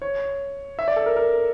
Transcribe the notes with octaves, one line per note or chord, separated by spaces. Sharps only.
C#5
E5
D5
A4
A#4
A#4